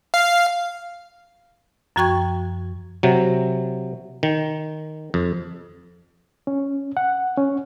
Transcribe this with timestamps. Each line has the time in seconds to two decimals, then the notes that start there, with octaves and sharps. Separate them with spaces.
0.14 F5
1.96 F#2 F3 F#4 G5 C#6 G#6
3.03 C3 F#3
4.23 D#3
5.14 F2
6.47 C#4
6.97 F#5
7.37 C#4